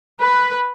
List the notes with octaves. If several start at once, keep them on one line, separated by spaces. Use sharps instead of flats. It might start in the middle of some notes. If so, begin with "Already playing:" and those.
B4